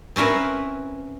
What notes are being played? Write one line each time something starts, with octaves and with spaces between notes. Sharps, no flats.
C4 C#4 E4 A#4 B4